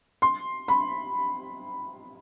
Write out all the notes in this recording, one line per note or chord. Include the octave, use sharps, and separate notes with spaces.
C6
B5